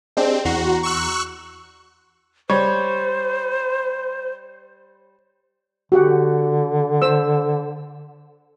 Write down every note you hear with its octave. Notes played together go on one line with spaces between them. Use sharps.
G#3 C4 D4 G4
E2 F#4 A#5 C6
C#6 E6 F#6
G3 C5 C#5
D3 F#4 G4 F#5
C5 E6